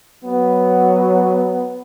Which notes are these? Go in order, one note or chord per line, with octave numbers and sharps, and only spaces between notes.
F#3 B3